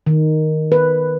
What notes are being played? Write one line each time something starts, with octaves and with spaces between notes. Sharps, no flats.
D#3
B4